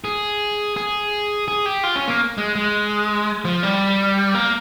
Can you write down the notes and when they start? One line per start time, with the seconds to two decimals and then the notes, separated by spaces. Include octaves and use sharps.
0.05 G#4
0.76 G#4
1.48 G#4
1.66 G4
1.83 F4
1.96 C#4
2.08 A#3
2.38 G#3
2.55 G#3
3.45 F3
3.63 G3
4.35 A#3